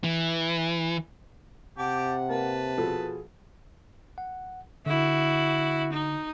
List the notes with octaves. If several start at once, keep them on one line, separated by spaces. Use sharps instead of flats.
E3
C3 G4 F#5 A5 D6
A#3 B4 A5
B2 F3 G#4 A4
F#5
D3 E4 F#4
D#4